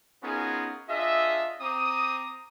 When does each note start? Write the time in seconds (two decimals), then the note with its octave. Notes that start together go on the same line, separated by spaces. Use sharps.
0.23 B3 C#4 D#4 F4 G#4 A#4
0.89 D4 F4 G#4 D#5 E5
1.61 C4 A#5 D6 D#6